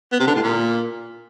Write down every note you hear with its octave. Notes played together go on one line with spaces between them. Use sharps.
B3
C3
D3
A2
A#2